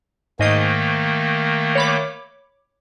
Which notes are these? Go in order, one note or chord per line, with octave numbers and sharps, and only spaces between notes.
G#2 D#3 A3 A#3 D#5 C7
C#5 B5 D6